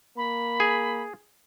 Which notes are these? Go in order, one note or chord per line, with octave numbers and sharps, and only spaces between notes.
A#3 B5
G#4